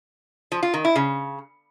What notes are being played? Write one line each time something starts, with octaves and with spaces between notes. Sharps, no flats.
F3
F4
D#3
E4
C#3